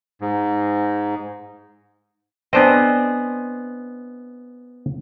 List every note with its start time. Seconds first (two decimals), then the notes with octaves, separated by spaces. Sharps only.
0.21 G#2
2.53 B3 C4 D4 G#4 C5 D#5